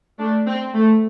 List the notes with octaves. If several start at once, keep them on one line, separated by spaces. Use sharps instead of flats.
A3 D4
C4
A3